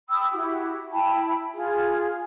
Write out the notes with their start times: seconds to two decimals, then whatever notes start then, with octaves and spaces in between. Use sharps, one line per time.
0.10 G5 B5 D#6 E6
0.32 E4 F#4 G4
0.92 E4 G5 A5 B5
1.54 F4 G#4